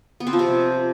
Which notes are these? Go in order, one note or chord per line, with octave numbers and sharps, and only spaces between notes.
B3
C4
F3
C3